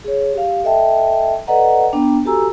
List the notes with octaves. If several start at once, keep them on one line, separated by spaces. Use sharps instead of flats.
G#4 C#5
G4 F5
A4 D#5 E5 G5 A5
A4 B4 D5 D#5 F#5 A#5
B3 D4 G5 A#5
F#4 G4 A4 G#5 A#5 E6